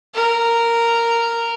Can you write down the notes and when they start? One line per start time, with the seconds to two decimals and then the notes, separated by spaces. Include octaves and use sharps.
0.14 A#4